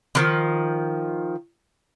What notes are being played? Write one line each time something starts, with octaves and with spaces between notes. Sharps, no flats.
D3 D#3 F3